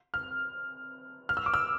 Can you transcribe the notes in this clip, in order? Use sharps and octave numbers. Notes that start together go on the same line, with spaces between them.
F6
F6
E6
D6
E6